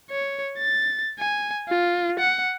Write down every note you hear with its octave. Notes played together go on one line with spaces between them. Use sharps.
C#5
A6
G#5
F4
F#5